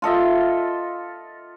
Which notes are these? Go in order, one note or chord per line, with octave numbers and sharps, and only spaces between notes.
F4 A4 D#5 E5